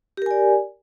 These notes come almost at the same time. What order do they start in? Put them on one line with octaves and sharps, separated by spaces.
G4 A#4 G#5 D5